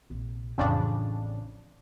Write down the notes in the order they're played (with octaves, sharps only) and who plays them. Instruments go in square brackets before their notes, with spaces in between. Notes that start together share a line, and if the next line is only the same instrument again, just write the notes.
[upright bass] A#1 C3
[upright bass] A1 [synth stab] F2 C#3 D4